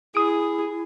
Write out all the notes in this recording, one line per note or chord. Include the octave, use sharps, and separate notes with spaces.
E4 G#4 D#6 D7